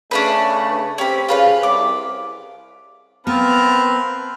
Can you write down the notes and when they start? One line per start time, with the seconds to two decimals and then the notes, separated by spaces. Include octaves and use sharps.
0.11 C#3 A3 C#4 D4 B4
0.98 C4 C#4 G4 B5
1.29 C#3 C#4 F4 B4 F5
1.63 C2 D6
3.27 B3 C4 A#4 B4 F5 A5